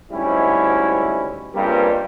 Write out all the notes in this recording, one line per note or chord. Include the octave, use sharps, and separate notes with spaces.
D2 G#2 G3 C#4 E4
C#2 G2 G3 G#3 A#3 C4